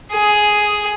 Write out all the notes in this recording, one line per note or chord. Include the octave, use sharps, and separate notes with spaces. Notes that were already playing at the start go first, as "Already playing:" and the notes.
G#4